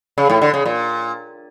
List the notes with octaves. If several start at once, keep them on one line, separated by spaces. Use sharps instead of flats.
C#3
A2
D3
C#3
A#2